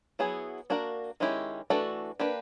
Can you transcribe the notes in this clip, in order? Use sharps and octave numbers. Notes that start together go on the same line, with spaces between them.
F#3 B3 E4 G#4
A#3 D4 F#4 A#4
D#3 G#3 C#4 E4 G4
E3 A3 D4 F#4 A4
A#3 D4 G4 B4